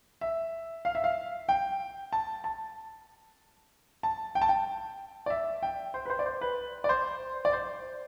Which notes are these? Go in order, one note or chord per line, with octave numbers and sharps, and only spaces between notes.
E5
F5
E5
F5
G5
A5
A5
A5
G5
A5
G5
D5
E5
G5
C5
B4
C5
D5
C5
B4
D5
C5
D5
C5